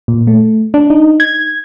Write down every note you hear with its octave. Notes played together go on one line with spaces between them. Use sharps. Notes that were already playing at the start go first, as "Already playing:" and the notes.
A#2
A3
D4
D#4
G#6